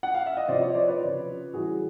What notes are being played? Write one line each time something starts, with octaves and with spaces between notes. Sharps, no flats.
F#5
F5
E5
D#5
C3 F3 C5 D5
C#5 D#5
C5 D5
B4 C#5
C#3 F3
A2 E3 G3 F#4 G#4